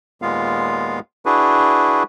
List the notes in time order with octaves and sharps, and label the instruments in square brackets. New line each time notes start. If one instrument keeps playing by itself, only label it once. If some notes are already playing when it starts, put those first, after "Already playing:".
[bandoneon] D#2 A#2 G#3 B3 F4 F5
D4 E4 F#4 G#4 B4